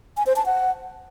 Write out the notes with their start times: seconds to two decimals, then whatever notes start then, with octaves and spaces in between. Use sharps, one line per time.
0.17 G#5
0.27 C5
0.36 A5
0.46 F#5